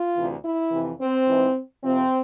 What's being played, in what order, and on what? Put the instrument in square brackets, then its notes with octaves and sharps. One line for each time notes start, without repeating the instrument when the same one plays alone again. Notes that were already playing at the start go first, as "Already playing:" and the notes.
Already playing: [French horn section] F4
D2 C3 E3
E4
F2 C3 E3
C4
G#2 E3
F2 C3 F3 C4